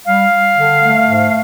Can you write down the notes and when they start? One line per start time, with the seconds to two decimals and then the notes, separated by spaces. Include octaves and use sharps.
0.07 G3 F5
0.32 G3
0.57 D3
0.82 A3
1.07 G#2